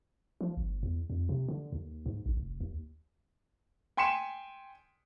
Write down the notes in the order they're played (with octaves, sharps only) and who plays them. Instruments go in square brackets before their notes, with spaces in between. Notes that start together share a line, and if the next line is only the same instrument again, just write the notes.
[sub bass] F3
G1
E2
F2
C3
D3
D#2
G#2
A1
F1
D#2
[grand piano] G5 G#5 C6 B6 C#7 E7